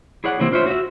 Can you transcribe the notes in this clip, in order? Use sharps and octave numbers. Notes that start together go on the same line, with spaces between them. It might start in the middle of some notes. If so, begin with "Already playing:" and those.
E4 G#4 C#5 D5 F#5
C3 E3 G3 A#3 C4 E4
D4 F4 C5 C#5 E5
F#4 E5